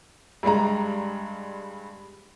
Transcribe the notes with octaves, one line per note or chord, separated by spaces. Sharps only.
G2 G3 G#3 A#5